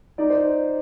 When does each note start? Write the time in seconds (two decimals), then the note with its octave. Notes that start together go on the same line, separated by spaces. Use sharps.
0.18 D#4 D5
0.30 C5